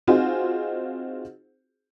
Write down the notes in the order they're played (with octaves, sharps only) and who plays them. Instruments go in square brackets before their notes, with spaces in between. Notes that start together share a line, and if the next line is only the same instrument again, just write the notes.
[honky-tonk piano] C4 D#4 F4 F#4 G#4 C5